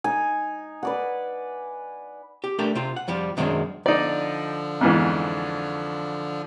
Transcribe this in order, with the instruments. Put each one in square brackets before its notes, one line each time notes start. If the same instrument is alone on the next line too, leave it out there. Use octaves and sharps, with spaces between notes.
[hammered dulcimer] D#4 G#5
B4 D5 F#5
[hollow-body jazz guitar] G4
A3 D4 G4 A#4 G5
C3 C4 F4
F#5
F2 F3 G3
F#2 D#3 F#3 G#3 C4 D4
[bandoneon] D3 F3 [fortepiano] D#4 D5
[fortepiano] F2 G#2 E3